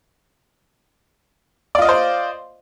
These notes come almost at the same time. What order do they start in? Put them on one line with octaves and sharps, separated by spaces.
D5 F4 D#5 F5 C5